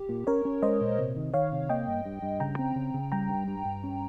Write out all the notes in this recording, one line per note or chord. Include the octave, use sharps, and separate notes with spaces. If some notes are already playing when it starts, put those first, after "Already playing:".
Already playing: G4
A#2
C#4 A#4 C#5
C#4
G#3 C5 D#5
A#2
C3
D#3
D#3 C#5 F5
C3
A#3 D#5 G5
G2
G2
G2
C#3 G5 A#5
C4
C#3
C#3
G3 G5 A#5
G2
G2
G2
C#4